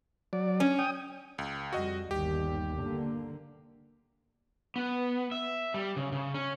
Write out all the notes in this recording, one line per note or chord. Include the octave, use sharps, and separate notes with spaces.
F#3 D5
C#4
G5 D#6
C#2
F2 G3 F#4 D#5
G1 D#2 G3 G4
D3 A#3
B3
E5
G3
C#3
C#3
C#4